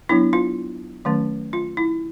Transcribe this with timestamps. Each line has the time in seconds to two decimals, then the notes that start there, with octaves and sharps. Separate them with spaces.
0.09 F#3 B3 D4 E4
0.33 F4
1.05 D#3 F#3 A3 C#4
1.53 F4
1.77 E4